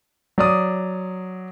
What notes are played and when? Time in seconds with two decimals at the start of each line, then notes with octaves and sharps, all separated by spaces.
0.38 F#3 D5 D#6